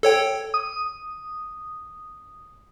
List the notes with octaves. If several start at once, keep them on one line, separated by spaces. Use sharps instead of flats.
A4 C#5 G5
D#6